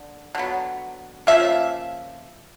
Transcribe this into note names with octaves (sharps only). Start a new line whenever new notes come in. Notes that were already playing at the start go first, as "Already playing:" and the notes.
Already playing: D3
D3 F#3 B3
C#3 F3 A#3 E5